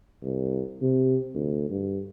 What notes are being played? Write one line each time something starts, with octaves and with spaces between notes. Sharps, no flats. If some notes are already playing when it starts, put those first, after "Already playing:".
C2
C3
D2
G2